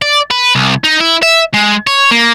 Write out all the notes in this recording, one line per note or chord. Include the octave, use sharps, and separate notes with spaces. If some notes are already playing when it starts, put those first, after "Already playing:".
D5
B4
C2
D#4
E4
E5
G#3
C#5
A#3